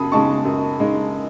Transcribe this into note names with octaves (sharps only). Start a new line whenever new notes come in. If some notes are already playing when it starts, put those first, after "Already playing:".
Already playing: F#2 C#3 A5 B5 D#6
C#3 G#3 D#4 A5 C#6
F#2
C#3 G#3 D#4